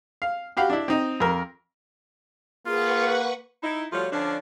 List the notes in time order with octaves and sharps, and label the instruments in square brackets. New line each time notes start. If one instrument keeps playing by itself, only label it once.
[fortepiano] F5
F#4 G4 F5 B5
D4 E4
C4 D#4
F2 A#4
[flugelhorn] A#3 [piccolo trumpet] F4 [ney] G#4 [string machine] B4 F#5 C#6
[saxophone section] D#4 E4
F3 G3 A3 F4 F#4 C#5
D3 F3 C#4 D4